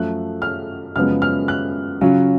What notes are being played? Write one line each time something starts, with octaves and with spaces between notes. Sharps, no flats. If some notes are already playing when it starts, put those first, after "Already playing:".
Already playing: F#2 F3 A3 F#6
F6
F#2 C#3 F3 G#3 B3 F6
F6
F#6
C#3 F#3 C#4 F4